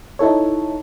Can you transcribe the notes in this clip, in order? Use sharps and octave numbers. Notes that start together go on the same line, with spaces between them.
D#4 E4 A4 C#5